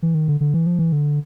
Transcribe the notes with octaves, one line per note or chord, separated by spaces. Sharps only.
E3
D#3
D3
D3
E3
F3
E3
D3